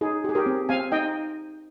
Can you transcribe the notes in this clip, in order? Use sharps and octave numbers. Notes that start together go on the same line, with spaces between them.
D#4 G#4
G4
G#4
G4 A#4
C4
C4 F5 G#5
D#4 D#5 G5